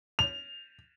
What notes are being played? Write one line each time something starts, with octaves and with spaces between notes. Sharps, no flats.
F7